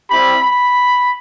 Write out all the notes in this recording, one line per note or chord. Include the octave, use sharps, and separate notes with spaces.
G3 C4 E4 G4 B5
B5